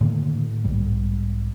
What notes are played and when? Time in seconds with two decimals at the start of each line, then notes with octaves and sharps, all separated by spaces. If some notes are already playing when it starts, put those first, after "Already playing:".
0.01 A2 D3 D#3 A#3
0.64 B1 G#2 G3